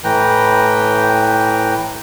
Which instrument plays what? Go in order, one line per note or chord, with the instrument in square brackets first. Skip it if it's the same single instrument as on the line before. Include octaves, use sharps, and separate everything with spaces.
[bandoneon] A2 E3 B4 G5 A#5